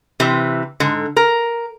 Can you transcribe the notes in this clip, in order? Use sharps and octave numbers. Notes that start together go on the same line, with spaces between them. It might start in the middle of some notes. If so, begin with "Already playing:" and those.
C3 E3
G#2 D3
A#4